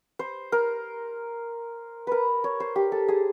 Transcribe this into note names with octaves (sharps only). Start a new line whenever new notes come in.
C5
A#4
A#4 B4
C#5
C5
G4
A4
G#4